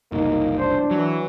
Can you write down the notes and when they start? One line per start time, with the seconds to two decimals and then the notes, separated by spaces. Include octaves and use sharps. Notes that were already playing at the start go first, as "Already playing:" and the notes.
0.12 F#1 C2 A#3 D#4
0.59 D4 C5
0.91 E3 F#3